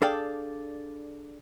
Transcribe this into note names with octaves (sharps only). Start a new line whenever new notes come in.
D4 G#4 A4 D5 F5 G5